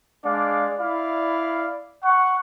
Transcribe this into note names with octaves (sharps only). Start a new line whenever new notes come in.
G#3 D4 D5 F5
E4 D5 F5 B5
F#5 C#6